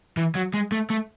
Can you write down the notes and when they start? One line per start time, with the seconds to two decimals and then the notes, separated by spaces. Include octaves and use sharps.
0.17 E3
0.35 F#3
0.54 G#3
0.72 A3
0.90 A3